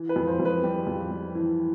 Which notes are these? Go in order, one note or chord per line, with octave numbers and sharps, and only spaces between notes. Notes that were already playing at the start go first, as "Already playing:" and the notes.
Already playing: E3
B4
F2
C5
F2
B4
G3 G4
F2
G3
E3